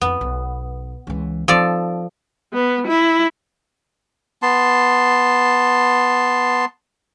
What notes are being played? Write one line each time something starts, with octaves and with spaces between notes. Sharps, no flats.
F2 B3 E4
B1
C#2 E3
F3 C4 D#4 A4 D5
B3
E4
B3 A5 C6